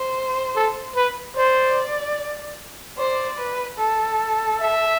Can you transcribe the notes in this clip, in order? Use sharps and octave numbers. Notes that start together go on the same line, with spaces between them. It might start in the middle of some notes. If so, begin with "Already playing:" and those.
Already playing: C5
A4
B4
C5 D5
C5 D5
B4
A4
E5